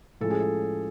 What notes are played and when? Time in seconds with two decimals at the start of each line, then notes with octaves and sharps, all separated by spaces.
0.21 A2 F3 G#3 C#4 A4
0.30 G#4
0.40 A4